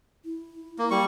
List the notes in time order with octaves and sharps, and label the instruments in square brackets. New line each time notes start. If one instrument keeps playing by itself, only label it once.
[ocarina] E4
[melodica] A#3
G3 C#6